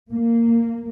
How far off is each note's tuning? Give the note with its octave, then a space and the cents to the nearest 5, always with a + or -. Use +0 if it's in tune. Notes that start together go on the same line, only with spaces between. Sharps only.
A#3 -10